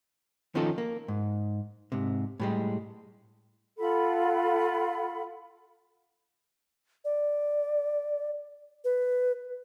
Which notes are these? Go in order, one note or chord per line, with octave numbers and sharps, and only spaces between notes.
D#3 F3 C#4 D#4 F4 A4
A#3
G#2
G#2 C3
A2 G3 G#3
F4 A4 F#5 B5
D5
B4